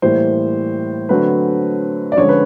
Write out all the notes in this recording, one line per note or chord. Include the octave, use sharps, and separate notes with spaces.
A2 E3 G3 A#3 C5
D3 F#3 A3 C4 B4
D5
D3 F3 G#3 C#4 C#5
B4